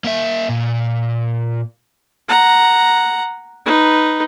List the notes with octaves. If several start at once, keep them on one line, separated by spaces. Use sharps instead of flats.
A#3 E5
A#2
F#5 A#5
D#4 B4